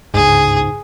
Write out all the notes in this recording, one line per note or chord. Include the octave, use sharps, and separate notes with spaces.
G1 C#2 G#2 G#4